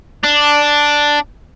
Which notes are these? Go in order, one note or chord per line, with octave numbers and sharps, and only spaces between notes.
D4